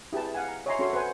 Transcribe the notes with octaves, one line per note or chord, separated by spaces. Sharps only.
E4 G4 G#4 B4 A5
F5 F#5 G#5
A#5
C#5 D#5 E5 G#5 A#5 C6
C#4 F#4 A4 C#5 E5 C6
B4 C5 F#5 G#5